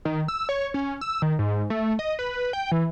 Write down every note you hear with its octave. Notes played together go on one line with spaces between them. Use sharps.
D#3
E6
C#5
C#4
E6
D#3
G#2
A3
D#5
B4
G5
E3